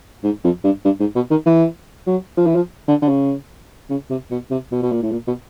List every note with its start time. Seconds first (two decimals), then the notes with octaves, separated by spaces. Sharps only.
0.24 G#2
0.44 F2
0.64 G2
0.85 G2
1.00 G#2
1.15 B2
1.30 D#3
1.46 E3
2.07 F#3
2.37 F3
2.47 E3
2.55 F3
2.88 D3
3.02 D3
3.08 C#3
3.90 C#3
4.10 C3
4.31 B2
4.51 C3
4.72 B2
4.82 B2
4.92 A#2
5.03 A2
5.12 A#2
5.27 B2